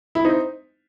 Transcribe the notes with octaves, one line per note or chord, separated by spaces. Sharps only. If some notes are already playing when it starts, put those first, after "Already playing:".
E4
C4 D#4